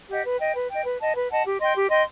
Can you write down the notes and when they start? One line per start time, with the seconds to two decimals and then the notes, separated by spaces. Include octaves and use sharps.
0.09 G4 D#5 F#5
0.25 B4
0.39 D#5 G5
0.55 B4
0.69 D#5 G5
0.84 B4
1.00 D#5 F#5 A5
1.15 B4
1.30 D#5 F#5 A5
1.45 G4
1.60 D#5 G5 C6
1.75 G4
1.90 D#5 G5 C6